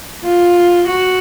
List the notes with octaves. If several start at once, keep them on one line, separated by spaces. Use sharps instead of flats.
F4
F#4